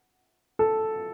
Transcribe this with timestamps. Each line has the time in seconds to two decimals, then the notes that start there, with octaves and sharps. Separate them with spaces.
0.59 A4